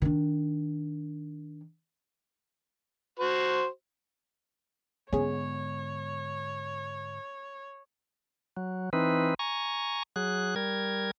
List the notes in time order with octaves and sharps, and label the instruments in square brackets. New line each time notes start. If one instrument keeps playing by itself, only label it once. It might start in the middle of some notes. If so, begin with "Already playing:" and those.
[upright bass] D#3 D4
[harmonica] F#4 C5
[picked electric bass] G#2 D3 G#3 [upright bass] B3 [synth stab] C#4 G#4 [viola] C#5
[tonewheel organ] F#3
E3 C4 D#4 B4
G#5 A#5 C#6
F#3 G#4 F#6
G3 A#4 G#6